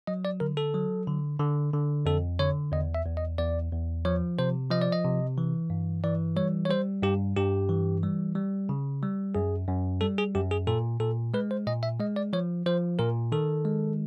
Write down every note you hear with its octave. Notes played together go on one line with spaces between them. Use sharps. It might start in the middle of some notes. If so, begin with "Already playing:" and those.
F#3 D#5
D5
D3 A#4
A4
F#3
D3
D3
D3
F2 A4
D3 C#5
E2 D#5
E5
E2
D#5
E2 D5
E2
F3 C#5
C3 C5
F3 D#5
D5
D#5
C3
E3
G2
E3 D5
G3 C#5
C#5
G3 C5
G2 G4
G2 G4
E3
G3
G3
C#3
G3
F#2 G#4
F#2
G3 A4
G#4
F#2 G4
G#4
A#2 A4
A#2 A4
G#3 B4
C5
A#2 D#5
E5
G#3 D#5
D5
F3 C#5
F3 C5
A#2 A#4
D#3 A4
G#3